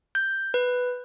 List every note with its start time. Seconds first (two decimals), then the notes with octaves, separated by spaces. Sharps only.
0.15 G6
0.54 B4